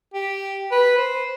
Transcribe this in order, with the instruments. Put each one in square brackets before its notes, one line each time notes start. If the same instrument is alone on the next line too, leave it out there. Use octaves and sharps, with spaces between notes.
[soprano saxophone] G4
B4
C5